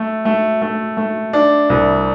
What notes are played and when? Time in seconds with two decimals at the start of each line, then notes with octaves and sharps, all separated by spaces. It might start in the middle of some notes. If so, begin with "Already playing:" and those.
Already playing: A3
0.25 A3
0.62 A3
0.97 A3
1.33 D4
1.70 C2